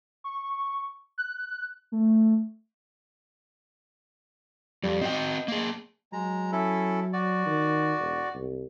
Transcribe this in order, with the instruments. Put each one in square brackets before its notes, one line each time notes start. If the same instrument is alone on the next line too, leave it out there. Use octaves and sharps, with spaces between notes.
[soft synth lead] C#6
F#6
A3
[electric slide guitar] F2 [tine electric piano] G3
[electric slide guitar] C4 F#4 G5 [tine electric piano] D#5
[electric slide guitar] A#3 G#4
[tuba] F#3 [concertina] G#3 A#5
[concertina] C#4 E4 A4
F#4 D5
[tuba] D#3
E1
C2